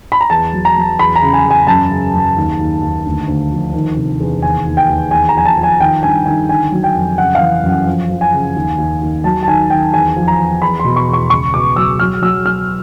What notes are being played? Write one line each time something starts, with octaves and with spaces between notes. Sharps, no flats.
B5
A#5
E2 A5
F#3
A#5
F#3
E2 B5
A#5
C#3
G#5
E2
G#5
F#2 A5
C#3
F#2
D#2
D#2
D#2
D2
D2
F3
D#3
C3
E2
D#2 G#5
D#2
G5
D#2
E2 G#5
A#5
F3 G#5
A5
F3
G#5
D#3 G5
G2 G#5
D#3 G#5
D3 G#5
F#3
G5
F2
C#3 F#5
F5
E3
F#2
F#5
F3
F3
G#5
C#3
D#2
D#2
D#2
F#3 A5
A5
D#3 G#5
D#3 G5
E2 G#5
F3
A#5
E2
E2 B5
B2 C6
C#6
E2
C#6
C#2 C#6
B2 D6
F#3 E6
F#3 F6
F#3 E6
F#3 F6